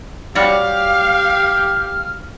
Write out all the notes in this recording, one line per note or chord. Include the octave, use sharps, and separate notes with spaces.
G3 F#4 G4 C#5 F5 F6